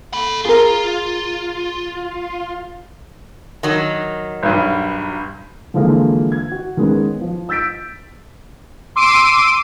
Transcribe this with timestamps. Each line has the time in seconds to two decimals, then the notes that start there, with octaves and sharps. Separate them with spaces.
0.13 A4 B5
0.45 F4 G#4 A#4
3.63 D#3 F#3
4.43 B1 G2
5.74 D3 E3 F3 G#3 A#3 E4
6.32 G#6
6.52 F#4
6.77 D#3 G#3 B3 C#4
7.21 F3
7.49 E6 G6 A6 B6 D7
8.96 C6 D6 E6 C7 D7 D#7